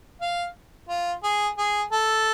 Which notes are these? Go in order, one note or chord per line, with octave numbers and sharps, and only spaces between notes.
F5
F4
G#4
G#4
A4